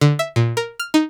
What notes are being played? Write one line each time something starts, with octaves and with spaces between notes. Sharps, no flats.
D3
E5
A#2
A#4
F6
D#4